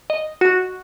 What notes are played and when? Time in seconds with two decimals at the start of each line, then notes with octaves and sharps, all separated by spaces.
0.10 D#5
0.41 F#4